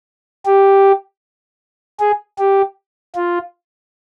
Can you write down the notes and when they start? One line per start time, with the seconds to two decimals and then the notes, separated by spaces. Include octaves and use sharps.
0.45 G4
2.00 G#4
2.38 G4
3.15 F4